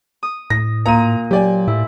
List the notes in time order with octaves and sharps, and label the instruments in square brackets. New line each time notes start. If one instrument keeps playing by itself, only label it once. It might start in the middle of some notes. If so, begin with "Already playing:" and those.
[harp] D#6
[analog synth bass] A2 [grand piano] A#6
[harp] A#2 [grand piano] A#5 D#7
[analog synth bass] F#3 [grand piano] G4 D5 G#5
[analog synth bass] A2 [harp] E4